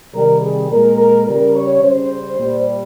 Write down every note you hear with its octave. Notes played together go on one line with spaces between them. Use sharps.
C3 D#3 G3 A#4
G#4
A#2 G#3 A#4
A#4
C#3 G3 A#4
C#5
C#3 G3 C5
A#2 G3